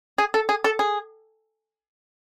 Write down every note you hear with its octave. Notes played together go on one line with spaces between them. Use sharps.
G#4
A4
G#4
A4
G#4